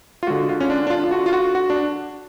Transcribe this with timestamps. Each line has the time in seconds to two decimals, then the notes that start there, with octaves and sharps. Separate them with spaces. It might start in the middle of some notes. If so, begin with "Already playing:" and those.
0.23 F4
0.27 D3 G#3 F#4
0.49 F4
0.60 C#4
0.70 D4
0.87 D4
0.90 F4
1.04 F4
1.11 F#4
1.26 F4
1.33 F#4
1.55 F#4
1.70 D4